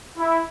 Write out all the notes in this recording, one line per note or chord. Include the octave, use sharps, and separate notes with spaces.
E4